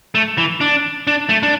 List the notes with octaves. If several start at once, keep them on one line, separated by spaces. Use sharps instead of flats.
A3
E3
D4
D4
A3
D4